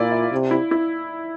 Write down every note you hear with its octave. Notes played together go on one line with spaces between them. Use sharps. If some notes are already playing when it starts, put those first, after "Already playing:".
Already playing: A#2 E4 F4 D5
E5
C3
E4
E4